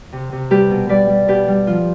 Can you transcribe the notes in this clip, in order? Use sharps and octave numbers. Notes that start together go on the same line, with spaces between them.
C3
C3
G3 G4 B4
B2
G3 B4 D5
G3
B2 G4 B4
G3
F3 F4